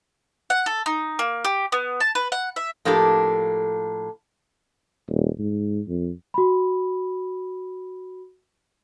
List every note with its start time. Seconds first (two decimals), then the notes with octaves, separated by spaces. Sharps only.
0.50 F#5
0.66 A4
0.86 D#4
1.19 A#3
1.45 G4
1.72 B3
2.00 A5
2.15 B4
2.32 F#5
2.56 E5
2.85 A2 F3 A#3 D4 G4 A4
5.09 D#1
5.39 G#2
5.88 F2
6.34 F#4 B5